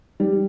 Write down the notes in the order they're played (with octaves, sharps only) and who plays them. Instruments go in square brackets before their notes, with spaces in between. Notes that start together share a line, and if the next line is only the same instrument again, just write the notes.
[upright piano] G3